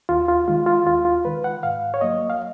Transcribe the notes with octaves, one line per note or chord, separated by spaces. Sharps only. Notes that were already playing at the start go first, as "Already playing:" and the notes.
D#2 F4
F4
D#3 G#3 F4
F4
D#2 F4
F4
D#3 G#3 B4
F#5
G#2 F5
C#5
F#3 A#3 D#5
F5